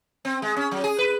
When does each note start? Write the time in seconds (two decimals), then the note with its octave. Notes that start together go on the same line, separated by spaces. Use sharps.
0.25 C4
0.42 G#3
0.56 C#4
0.71 F#3
0.84 G#4
0.98 B4